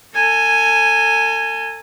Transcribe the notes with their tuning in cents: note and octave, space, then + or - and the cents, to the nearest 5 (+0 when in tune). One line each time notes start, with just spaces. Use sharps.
A4 +40 G#5 +0